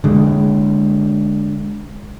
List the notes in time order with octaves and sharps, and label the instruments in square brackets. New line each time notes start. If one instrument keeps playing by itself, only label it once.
[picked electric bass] D3 G#3